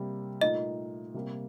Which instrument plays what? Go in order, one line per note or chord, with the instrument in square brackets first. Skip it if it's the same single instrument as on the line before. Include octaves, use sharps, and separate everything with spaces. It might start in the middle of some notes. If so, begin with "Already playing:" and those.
Already playing: [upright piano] C3 G3 A#3
[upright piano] A#2 A3 D#4 [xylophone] D#5
[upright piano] C3 G3 A#3